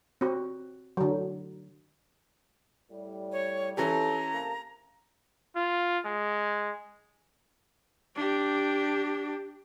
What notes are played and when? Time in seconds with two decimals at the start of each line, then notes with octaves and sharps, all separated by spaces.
0.21 C4 F#4
0.97 D3 F#3
2.91 A2 G3
3.32 C#5
3.77 F2 E3 C#4 G4 A4 A#5
4.32 C3 A#3 A4
5.56 F4
6.05 G#3
8.16 D4 G4